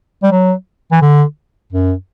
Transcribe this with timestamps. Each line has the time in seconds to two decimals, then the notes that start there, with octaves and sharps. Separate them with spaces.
0.23 G3
0.32 F#3
0.92 E3
1.02 D3
1.72 F#2